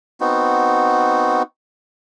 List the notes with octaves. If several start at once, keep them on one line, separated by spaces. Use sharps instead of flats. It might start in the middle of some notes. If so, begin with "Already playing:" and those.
B3 C4 D#4 F#4